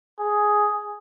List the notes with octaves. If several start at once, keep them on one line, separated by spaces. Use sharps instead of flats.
G#4